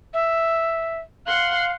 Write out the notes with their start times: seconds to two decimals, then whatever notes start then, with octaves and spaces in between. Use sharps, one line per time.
0.14 E5
1.26 F5 F#5 C6 F#6